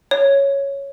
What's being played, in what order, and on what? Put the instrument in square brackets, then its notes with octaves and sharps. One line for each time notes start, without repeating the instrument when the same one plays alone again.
[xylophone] C#5